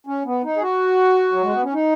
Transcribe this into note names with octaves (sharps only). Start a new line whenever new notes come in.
C#4
B3
D#4
G#4
F#4
F#3
G#3
B3
C#4
D#4